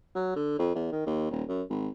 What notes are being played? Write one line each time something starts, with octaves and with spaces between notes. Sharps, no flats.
F#3
D3
F2
E2
D#3
D#2
D#1
F#2
G#1